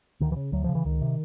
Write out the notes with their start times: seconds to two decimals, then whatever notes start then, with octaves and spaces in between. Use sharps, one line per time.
0.20 D2 D#3
0.32 E3
0.36 C#3
0.52 D2 F#3
0.64 C#3 F3
0.75 E3
0.85 C#2 D#3
1.01 C3